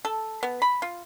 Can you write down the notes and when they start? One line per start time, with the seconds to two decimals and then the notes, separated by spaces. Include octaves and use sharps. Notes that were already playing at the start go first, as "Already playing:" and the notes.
0.05 A4
0.43 B3
0.62 B5
0.82 F4